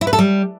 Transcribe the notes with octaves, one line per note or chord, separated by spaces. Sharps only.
E4
B4
A4
G3